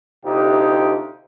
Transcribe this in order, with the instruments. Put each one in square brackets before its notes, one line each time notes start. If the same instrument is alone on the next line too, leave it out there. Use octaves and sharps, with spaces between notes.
[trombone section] D2 C3 D#4 F4 G4